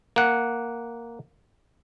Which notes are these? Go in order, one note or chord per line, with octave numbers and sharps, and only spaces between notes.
A#3 F#5